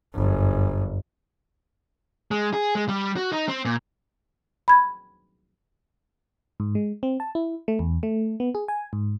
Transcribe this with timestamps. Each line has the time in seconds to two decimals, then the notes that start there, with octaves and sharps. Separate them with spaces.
0.14 G1 F#2
2.31 G#3
2.53 G#4
2.75 G#3
2.89 G3
3.16 F#4
3.32 D#4
3.48 C4
3.65 A#2
4.68 B5 G#6
6.60 G#2
6.75 G#3
7.03 C4
7.20 A5
7.35 E4
7.68 A3
7.79 E2
8.03 A3
8.40 B3
8.55 G#4
8.68 G#5
8.93 G#2